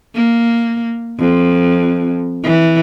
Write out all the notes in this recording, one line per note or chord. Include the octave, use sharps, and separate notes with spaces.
A#3
F2
E3